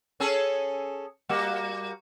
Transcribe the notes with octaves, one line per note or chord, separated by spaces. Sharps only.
C#4 G#4 A4
G3 A#3 F#4